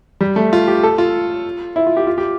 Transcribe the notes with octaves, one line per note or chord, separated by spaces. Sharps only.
G3
A3
F4
G4
A4
F4
E4
F4
G4
F4
G4